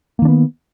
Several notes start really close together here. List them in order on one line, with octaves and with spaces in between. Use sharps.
A#3 D#3 D4 B3